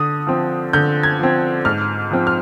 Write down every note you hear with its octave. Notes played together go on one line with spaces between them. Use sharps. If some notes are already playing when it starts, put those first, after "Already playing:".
Already playing: D3 D#6
F3 C4
D3 G6
G#6
F3 C4
G#2 F6
F3 C4
F6